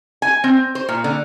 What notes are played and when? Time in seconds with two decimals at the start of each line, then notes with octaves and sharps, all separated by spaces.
0.22 G#5
0.44 C4
0.75 C5
0.89 A#2
1.04 D3